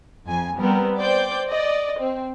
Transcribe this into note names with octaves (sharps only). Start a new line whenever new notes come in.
F2 G#5
G3 B3 C4 A#4
C5 D5 G5 D6 G6
D5 D#5
C4